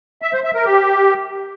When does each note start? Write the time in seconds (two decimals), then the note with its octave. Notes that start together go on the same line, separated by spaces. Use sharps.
0.22 E5
0.33 C5
0.44 E5
0.54 A#4
0.65 G4